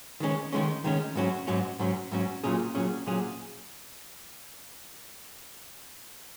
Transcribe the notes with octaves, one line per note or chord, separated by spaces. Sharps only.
D#3 G#3 C#4
D#3 G#3 C#4
D#3 G#3 C#4
G#2 F#3 C#4
G#2 F#3 C#4
G#2 F#3 C#4
G#2 F#3 C#4
A#2 F#3 C#4 G#4
A#2 F#3 C#4 G#4
A#2 F#3 C#4 G#4